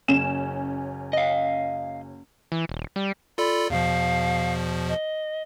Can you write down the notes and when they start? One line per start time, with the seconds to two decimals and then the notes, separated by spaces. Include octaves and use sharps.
0.08 F#1 C#4 E7
1.13 D#5 F5
2.52 E3
2.69 D#1
2.96 G3
3.38 F4 A4 D5 B5
3.70 E2 B2 F3 F5
4.88 D#5